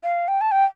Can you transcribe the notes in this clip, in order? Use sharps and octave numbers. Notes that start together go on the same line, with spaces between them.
F5
G5
A5
G5